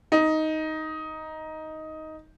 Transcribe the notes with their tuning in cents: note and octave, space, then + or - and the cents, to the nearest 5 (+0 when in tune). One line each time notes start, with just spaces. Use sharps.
D#4 +10